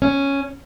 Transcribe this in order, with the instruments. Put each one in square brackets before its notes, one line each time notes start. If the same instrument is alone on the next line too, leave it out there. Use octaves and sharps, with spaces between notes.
[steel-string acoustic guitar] C#4